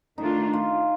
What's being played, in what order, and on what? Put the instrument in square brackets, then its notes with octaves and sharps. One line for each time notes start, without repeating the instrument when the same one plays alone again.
[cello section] D#3 A3 D4 F4 [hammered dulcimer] D#4
[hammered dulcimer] F4